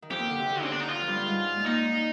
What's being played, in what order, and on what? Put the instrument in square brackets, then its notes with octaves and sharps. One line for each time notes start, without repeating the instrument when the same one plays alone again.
[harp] D#3
[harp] F2 F3 [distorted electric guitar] G4
[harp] D#2 D#3
D3
C3
D3
[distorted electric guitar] C4
[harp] D3 [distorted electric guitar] D4
[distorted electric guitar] D#4
F4
[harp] F3
G2 G3
G3
G#2 G#3
G#3
[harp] A#2 A#3 [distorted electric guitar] D#4